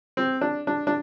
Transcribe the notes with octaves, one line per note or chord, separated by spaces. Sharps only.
C4
D4
D4
D4